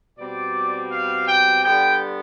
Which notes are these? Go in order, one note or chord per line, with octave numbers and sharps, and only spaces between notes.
B2 G3 C4 D5
F5
G5
D3 G3 B3 G5